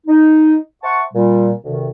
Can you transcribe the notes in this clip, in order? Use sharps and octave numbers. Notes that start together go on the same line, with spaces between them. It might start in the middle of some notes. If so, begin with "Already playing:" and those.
D#4
C5 E5 F#5 A5 C#6
A#2 G3
D2 C3 D#3